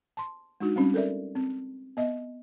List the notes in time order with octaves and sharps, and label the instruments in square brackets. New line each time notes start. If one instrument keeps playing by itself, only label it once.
[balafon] A5 C6
G#3 D4 D#4 F#4
G3 C4 C#4
A4 A#4 D5 E5
C4
B3 D#5 E5